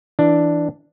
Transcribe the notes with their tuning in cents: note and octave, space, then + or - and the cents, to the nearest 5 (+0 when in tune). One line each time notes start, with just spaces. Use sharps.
E3 +0 D4 +0